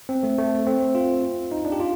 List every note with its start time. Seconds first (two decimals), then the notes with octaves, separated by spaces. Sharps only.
0.09 C4
0.23 A3
0.38 A3
0.67 C4
0.95 F4
1.52 D#4
1.65 D4
1.72 G4
1.80 F4